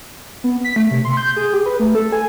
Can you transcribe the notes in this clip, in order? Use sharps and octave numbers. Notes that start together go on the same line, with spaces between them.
B3
B6
A3
C3
C6
G6
G#4
G4
B4
A3
A4
G#5